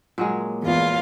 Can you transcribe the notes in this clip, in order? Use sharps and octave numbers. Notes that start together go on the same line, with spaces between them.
A#2 F#3 G#3
E2 F4